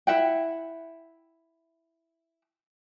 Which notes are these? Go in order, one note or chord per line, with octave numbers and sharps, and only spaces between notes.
E4 E5 F#5 G5